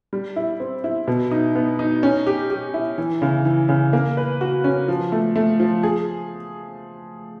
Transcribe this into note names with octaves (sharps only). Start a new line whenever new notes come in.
G3
E4
C4
E4
B2
D#4
B3
D#4
C#4
G4
G4
E4
E3
C#3
E3
C#3
A#3
B4
F#4
C#4
F3
A3
A3
F3
G#4